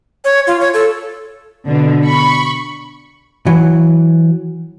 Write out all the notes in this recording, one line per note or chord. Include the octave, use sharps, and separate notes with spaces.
C#5
F4
C#5
A4
B2 D3
B5 C#6
E3 F#3